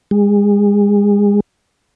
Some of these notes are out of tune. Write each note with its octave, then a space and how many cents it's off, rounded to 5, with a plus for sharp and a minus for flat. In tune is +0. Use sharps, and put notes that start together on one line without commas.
G#3 -30